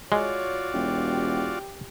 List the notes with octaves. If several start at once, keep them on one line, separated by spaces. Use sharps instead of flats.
G#3 F4 F#4 C#5 D5
E1 G4